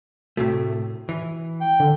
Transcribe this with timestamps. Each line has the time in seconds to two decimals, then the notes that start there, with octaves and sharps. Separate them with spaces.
0.37 A2 C3 A3 F#4
1.09 E3
1.61 G5
1.80 D3 D#3